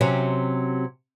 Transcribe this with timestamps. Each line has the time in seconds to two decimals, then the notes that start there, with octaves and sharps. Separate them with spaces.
0.01 C3 F#3 C#4